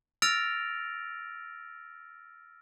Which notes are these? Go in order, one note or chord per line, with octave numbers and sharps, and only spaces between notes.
E6 F6 A6 A#6 D7 F7